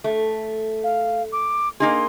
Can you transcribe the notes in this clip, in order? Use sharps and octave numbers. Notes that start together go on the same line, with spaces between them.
A3
F5
D6
A#3 D#4 G#4 C6